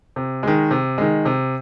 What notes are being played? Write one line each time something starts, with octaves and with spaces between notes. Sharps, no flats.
C3
D#3 G#3
C3
D#3 G#3
C3